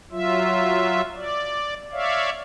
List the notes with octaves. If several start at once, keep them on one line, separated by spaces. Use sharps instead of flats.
F#3 F4 E5
D5
C#5 D5 E5 F5